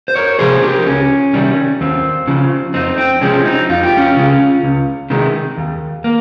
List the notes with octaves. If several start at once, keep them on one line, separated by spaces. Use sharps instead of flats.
C5
A#4 C#5
C3 F3 G#3 G#4 C5
G4 A#4
C#2 C#4
C3 D#3 G3
D#2 C4
C#3 F3
F2 C4 D#4
C4
C3 F3 G#3 C#4
C4 D#4
F2 F4
G4
C#4 F4
C#3 G#3
C#2
C3 D#3 G#3
D#2
A#3